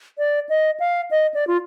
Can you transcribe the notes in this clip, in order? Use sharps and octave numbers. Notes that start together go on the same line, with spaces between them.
D5
D#5
F5
D#5
D5
F4